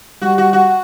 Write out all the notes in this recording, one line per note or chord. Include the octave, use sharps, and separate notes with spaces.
G3 F#4
F#4
F#4